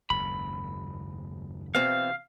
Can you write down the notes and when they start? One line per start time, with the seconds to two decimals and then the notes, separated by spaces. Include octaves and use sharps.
0.10 F#1 D#2 G#2 B5
1.75 E2 B2 C4 F5